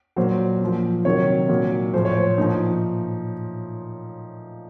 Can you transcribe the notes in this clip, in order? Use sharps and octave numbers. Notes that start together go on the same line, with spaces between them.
A#2 F#3 C5
A#2 F3
C3 D#3 F#3 C#5
A#2 F#3
A2 F3 C5
C#5
C5
A#2 F3 D#4